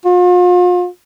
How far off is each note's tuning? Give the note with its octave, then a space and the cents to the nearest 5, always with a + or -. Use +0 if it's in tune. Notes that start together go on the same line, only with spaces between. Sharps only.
F4 +40